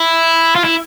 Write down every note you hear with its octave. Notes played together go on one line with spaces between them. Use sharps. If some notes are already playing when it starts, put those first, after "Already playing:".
Already playing: E4
F4
E4